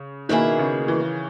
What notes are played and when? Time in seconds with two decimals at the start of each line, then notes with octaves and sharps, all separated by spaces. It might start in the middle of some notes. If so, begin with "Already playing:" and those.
Already playing: C#3
0.29 B2 D#3 A#3 E4 G#4
0.59 C#3
0.88 E3